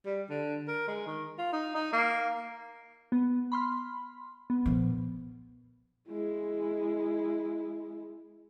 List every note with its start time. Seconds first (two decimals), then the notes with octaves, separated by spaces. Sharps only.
0.05 G3
0.29 D3
0.68 A#4
0.88 G#3
1.06 D#3
1.38 F4
1.52 D#4
1.75 D#4
1.93 A#3
3.12 B3
3.52 B5 C6 F6
4.50 B3
4.66 A#2 F3
6.09 G#3 E4